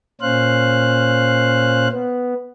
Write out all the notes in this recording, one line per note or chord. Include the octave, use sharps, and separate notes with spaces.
A#2 C#4 C5 F5 F#6
B3